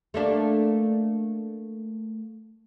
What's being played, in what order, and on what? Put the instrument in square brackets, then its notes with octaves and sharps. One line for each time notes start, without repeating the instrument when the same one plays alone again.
[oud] A3 A#3 D4